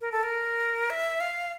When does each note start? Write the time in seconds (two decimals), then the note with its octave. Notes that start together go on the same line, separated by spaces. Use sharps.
0.01 A#4
0.12 A4
0.23 A#4
0.90 E5
1.20 F5